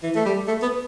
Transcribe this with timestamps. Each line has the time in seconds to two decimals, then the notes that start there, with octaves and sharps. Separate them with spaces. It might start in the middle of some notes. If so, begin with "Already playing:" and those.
0.03 E3
0.15 A3
0.25 G3
0.48 A3
0.62 B3